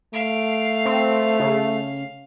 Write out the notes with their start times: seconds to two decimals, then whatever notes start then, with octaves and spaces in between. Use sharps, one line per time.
0.14 A3 F5 D7
0.85 C4
1.40 C#3